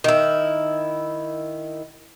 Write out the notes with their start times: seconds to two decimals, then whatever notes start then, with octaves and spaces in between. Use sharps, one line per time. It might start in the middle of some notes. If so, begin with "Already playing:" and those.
0.04 D#3 E4